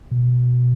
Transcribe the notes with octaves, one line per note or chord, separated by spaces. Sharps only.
B2